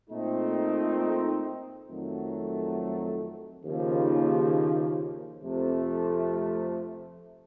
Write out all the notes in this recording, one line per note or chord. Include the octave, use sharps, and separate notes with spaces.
A#2 A3 C4 D#4
F2 D#3 F#3 A3
D#2 C#3 F3
F2 C3 F3 A3